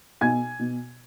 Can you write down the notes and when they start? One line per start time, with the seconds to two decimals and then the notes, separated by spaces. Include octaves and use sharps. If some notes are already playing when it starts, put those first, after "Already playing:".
0.21 B2 G#5 G#6
0.60 B2